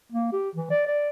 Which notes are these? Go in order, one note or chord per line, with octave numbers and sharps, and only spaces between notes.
A#3
G4
E3
D5
D5